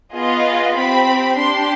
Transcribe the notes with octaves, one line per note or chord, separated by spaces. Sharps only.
B3 F4 G#4 D#5
C4 G4 B5
D4 G4 C6